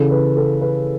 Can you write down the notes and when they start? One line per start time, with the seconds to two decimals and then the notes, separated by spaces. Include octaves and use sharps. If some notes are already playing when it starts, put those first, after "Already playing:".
Already playing: C#3 E3 A4
0.11 B4
0.36 A4
0.61 B4